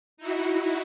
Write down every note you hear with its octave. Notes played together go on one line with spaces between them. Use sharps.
D#4 E4 F#4